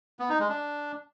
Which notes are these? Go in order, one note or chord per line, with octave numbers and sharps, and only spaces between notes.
B3
D#4
G#3
D4